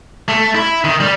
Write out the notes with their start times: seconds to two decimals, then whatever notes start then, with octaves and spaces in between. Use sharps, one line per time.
0.28 A3
0.55 E4
0.84 D#3
1.00 G3